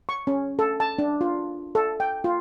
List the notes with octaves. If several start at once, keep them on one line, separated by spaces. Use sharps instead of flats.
C#6
C#4
A4
A5
D4
F4
A4
G5
F4